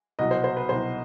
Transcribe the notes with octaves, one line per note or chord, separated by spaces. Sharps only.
C2 B2 F#3 D#5
C5
C5
B4
C2 B2 F#3 C5